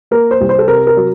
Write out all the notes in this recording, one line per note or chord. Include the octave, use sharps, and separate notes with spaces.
A#3 A#4
C5
C2
C5
A4
C3 A#4
A#4
F#3